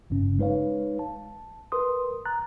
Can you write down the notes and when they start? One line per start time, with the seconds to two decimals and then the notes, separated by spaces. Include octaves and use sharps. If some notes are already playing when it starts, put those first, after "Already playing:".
0.10 G1 G2 C#3 C#4
0.38 G#3 D#4 B4 C#5 F5
0.99 A5
1.72 A#4 B4 C6 D#6
2.25 A#5 F#6 A6